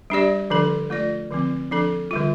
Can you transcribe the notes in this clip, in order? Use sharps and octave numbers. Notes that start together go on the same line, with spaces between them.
G3 D4 G4 D5
D3 F3 D4 A4
A3 F4 D5
D3 F3 C4
F3 D4 A4
D3 G3 F4